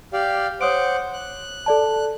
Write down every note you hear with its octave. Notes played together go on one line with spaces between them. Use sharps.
G4 D5 F5
C5 C#5 F#5 D6 D#6 D7
F#6
A4 D5 A5